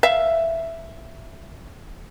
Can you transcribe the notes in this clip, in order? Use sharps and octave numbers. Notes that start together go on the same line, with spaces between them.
E5 F5